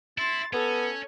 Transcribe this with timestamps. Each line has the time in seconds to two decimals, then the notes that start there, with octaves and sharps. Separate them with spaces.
0.18 E4 C6 A6
0.53 B3 C#4 A4